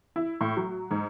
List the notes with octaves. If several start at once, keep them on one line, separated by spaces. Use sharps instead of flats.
E4
A2
F#3
G#2